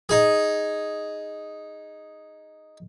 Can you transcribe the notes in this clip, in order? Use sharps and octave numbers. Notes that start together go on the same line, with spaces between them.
D#4 G#4